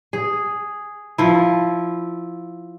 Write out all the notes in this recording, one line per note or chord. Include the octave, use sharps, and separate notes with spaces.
G#4
F3 E4